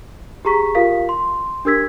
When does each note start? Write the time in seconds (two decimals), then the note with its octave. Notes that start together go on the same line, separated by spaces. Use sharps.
0.45 G4 G#4 A#5 C#6 B6
0.75 F4 G4 A#4 F5 B6
1.09 C6
1.65 D4 G4 A#4 E6 G#6 B6